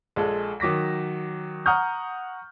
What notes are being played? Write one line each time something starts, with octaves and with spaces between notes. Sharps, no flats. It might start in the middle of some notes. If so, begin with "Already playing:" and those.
A#1 G#3 A4
D#3 F#3 D6 A#6 B6
F#5 A#5 C#6 D#6 F6 G6